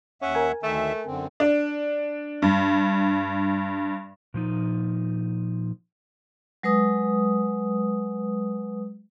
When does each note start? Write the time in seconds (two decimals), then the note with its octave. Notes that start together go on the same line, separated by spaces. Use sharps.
0.22 D#2 C#4 E5 F#5
0.35 A#4 G#5
0.63 D2 D#3 A3 E5
1.06 F#2 D3 C4
1.40 D4
2.42 G2
4.34 A#2 F3 D#4
6.63 F#3 G#3 B4 D#6